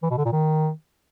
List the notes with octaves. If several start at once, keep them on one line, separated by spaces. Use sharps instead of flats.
E3
B2
D3
A#2
D#3